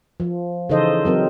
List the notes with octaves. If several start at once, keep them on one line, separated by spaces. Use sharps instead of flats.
F3
C#3 E3 D#4 A4 C5 D#5
F#3 C4 A#4